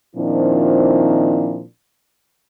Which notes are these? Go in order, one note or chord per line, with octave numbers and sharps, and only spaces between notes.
A#2 D#3 F3 C4 D4 E4